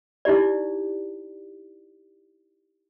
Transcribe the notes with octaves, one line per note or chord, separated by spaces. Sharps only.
D#4 E4 G4 D5